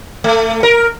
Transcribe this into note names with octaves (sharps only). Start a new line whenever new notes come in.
A3
A#4